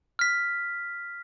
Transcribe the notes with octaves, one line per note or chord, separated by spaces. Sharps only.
F6 B6